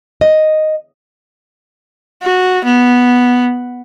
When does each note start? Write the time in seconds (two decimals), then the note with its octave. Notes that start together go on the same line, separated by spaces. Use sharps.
0.21 D#5
2.23 F#4
2.65 B3